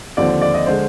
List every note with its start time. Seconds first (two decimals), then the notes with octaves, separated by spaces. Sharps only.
0.17 D#2 D3 F3 C4 D5
0.41 D5
0.54 D#5
0.66 D3 G#3 C5